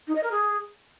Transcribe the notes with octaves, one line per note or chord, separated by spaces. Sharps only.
D#4
D#5
A#4
G#4